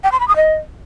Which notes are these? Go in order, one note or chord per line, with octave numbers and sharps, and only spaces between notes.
G5
C6
B5
D#6
D#5